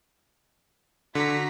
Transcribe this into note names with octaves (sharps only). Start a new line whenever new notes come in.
D3 F#4 A#5 B6